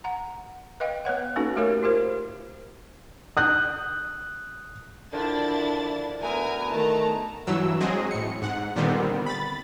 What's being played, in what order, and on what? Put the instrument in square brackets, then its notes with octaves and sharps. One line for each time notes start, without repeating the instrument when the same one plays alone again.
[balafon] F#5 A#5
B4 D#5 F5 G5
B3 B4 C#5 F#5
A#3 C#4 D#4 F#4 A4 B4
A3 G4 A#4 C#5 F5
F4 G4 A#4 C5
[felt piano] D#6 F#6 G6
[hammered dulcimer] D3 D#3 F3 [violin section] D4 E4 A6
[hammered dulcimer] B2 A3 B3 [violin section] A#4 G#5 A#5
[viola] D#3 A3 [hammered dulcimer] E3 [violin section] A5 A#5
[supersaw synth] G2 E3 F#3 E6
F#3 G#3 C4 G#4 D#5
A2 C#7
G#2 F#5
A#2 D3 D#3 G3 B3 C4
B5 A6